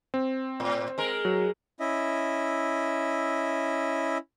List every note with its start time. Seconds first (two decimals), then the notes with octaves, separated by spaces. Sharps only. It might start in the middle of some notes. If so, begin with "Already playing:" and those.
0.14 C4
0.60 A2
0.98 G#3 A#4
1.25 F#3
1.80 C#4 E4 D#5 E5